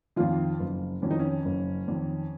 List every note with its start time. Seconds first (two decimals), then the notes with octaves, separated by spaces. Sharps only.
0.16 F2 D#3 F3 F4
0.60 F#1
1.02 F2 D#3 C#4
1.11 D#4
1.19 C#4
1.45 F#1
1.88 F2 D#3